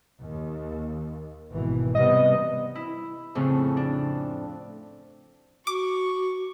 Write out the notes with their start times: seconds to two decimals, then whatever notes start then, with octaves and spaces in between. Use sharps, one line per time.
0.22 D#2
1.51 G#1 B2 E3
1.95 C3 G3 B3 D#5
2.75 E4
3.35 F2 A2 C#3
3.77 D4
5.67 F#4 C#6 D6